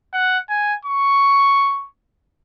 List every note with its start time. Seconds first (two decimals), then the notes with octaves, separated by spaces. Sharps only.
0.13 F#5
0.49 G#5
0.85 C#6